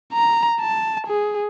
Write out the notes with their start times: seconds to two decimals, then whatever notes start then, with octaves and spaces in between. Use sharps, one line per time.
0.13 A#5
0.60 A5
1.07 G#4